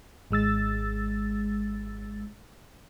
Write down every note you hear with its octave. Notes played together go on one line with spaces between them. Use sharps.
G#1 G#3 E6 A6